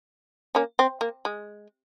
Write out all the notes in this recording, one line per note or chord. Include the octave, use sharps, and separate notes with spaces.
A#3 C#4
C4
A#3
G#3